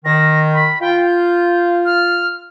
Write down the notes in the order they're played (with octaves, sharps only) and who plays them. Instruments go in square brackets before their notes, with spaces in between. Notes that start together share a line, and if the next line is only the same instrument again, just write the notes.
[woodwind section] D#3 [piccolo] A#6
[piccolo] B5
[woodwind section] F4 [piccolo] G5
[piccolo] G6
F6